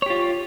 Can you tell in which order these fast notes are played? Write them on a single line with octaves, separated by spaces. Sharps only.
C#5 G4 F4